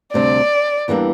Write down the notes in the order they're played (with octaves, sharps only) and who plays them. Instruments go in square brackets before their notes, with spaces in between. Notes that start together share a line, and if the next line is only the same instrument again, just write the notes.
[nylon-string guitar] D2 C3 G3 D4 [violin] D5
[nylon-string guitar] E2 E3 G3 A#3 D4